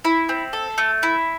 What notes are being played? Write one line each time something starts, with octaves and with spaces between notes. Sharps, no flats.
E4
C4
A4
A3
E4